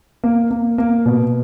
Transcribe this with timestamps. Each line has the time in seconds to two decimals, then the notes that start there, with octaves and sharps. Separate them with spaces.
0.24 A#3
0.51 A#3
0.78 A#3
1.06 B2